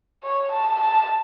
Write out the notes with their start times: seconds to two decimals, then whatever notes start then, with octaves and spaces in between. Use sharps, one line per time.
0.23 C#5
0.53 A5
0.81 A5